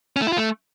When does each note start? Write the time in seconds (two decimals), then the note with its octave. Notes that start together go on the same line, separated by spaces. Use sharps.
0.16 C#4
0.22 A3
0.27 E4
0.32 F4
0.38 A3